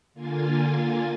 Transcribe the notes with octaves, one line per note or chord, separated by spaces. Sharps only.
D3 A#3 F4 G#5 A6